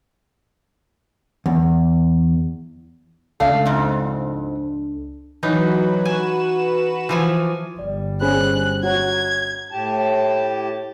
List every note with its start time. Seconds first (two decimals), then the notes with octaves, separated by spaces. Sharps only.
1.46 E2
3.40 C#2 A3 D4 A4 F5
3.65 F2 G#2
5.43 E3 F#3 D#4 B4
6.05 F#4 B4 G#5 E7
7.09 E3 F3 G#5
7.79 G1 G3 D5
8.21 C#4 G#4 C5 B5 F#6
8.83 F#4 C#5 A#5 F#6 G#6
9.71 A2 G4 A5